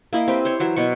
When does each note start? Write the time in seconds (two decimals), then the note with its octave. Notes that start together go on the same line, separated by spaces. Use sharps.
0.13 A#3 E4 D#5 B5
0.28 C4 G4 B4
0.45 C5 C#5
0.60 E3 F#3 E5
0.76 B2 F#3 C#6